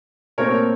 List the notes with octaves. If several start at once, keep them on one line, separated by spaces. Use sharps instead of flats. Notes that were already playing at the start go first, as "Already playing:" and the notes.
A#2 A3 C4 A#4 C#5